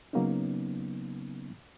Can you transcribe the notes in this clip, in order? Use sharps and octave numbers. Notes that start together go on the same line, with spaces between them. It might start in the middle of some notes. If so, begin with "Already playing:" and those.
C#3 F#3 A#3 B3 C#4 D#4